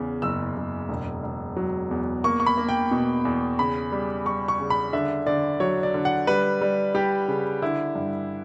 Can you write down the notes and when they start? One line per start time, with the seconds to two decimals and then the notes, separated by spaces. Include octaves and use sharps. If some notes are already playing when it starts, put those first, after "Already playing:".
Already playing: E2 C#3
0.22 F#1 E6
0.56 F#1
0.89 E1
1.23 E1
1.56 F#3
1.91 E2
2.24 A#3 C#6
2.40 C#6
2.46 B5
2.57 A#3
2.69 G5
2.91 B2
3.25 E2
3.59 C#3 B5
3.92 G3
4.25 G3 C#6
4.48 C#6
4.59 C#3
4.70 B5
4.93 D3 E5
5.26 D3 D5
5.60 F#3 C#5
5.83 D5
5.94 D3
6.05 F#5
6.27 G3 B4
6.61 G3
6.94 G3 G4
7.28 C#3
7.62 D3 E4
7.95 G2